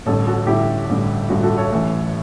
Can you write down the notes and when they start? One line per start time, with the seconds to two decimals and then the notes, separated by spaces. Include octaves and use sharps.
0.06 A1 G2 D3 A4 C#5
0.26 F#4 A4
0.47 A1 G2 D3 E4 G4
0.89 A1 G2 D3
1.29 A1 G2 D3 F#4
1.43 F#4 A4
1.57 A4 C#5
1.71 A1 A2 E3